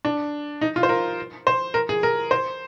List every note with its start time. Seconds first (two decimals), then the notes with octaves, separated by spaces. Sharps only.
0.05 D4
0.61 D#4
0.76 F4
0.83 C5
0.89 A#4
1.47 C5
1.74 A#4
1.89 G#4
2.03 A#4
2.31 C5